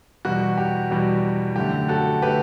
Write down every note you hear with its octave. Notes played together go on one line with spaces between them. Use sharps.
E2 B2 G3 F#4
G4
E2 B2 G3
F#2 D3 A3 G4
F#4 A4
D3 A3 G4 B4